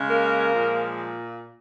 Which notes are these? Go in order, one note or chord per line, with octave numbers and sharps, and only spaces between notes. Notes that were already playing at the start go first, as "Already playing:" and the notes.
Already playing: C#3 G#3
A#3 A#4
A#2 F3 G#3